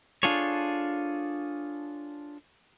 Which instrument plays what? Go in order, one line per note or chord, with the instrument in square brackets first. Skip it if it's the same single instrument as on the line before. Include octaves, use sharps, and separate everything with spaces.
[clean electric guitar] D4 F4 G#4 A4 C#5